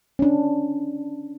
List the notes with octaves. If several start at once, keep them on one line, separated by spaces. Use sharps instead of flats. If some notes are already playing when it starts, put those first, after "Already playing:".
C#4 D4